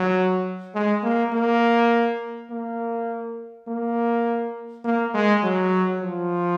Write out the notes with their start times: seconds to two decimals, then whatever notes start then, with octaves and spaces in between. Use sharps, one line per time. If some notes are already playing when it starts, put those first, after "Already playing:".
Already playing: F#3
0.75 G#3
1.03 A#3
1.33 A#3
2.50 A#3
3.68 A#3
4.85 A#3
5.14 G#3
5.43 F#3
6.02 F3